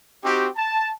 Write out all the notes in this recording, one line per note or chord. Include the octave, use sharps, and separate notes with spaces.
C4 D#4 F#4 G4
A5